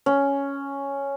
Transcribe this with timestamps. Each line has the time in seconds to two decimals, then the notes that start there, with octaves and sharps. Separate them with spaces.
0.06 C#4